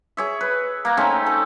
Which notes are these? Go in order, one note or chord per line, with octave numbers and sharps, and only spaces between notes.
G#4 C#5 E5
B4
A#3 A#5
A3 C4 C#4 D#4
A4